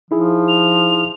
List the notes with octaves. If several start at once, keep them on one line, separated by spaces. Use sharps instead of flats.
F3 D#4 E4 G#4
F7